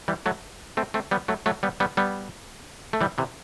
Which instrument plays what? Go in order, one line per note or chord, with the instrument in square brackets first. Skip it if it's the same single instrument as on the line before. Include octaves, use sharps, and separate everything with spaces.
[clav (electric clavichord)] E3 G3
F#3 A3
A3 C4
A3 C4
G3 B3
F#3 A3
F#3 A3
G3 B3
G3 B3
G3 B3
A3
E3 G3
C3 E3